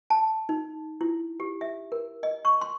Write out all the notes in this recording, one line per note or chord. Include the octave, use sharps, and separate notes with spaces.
A5
D#4
E4
G4
E5
A#4
D#5
C#6
C6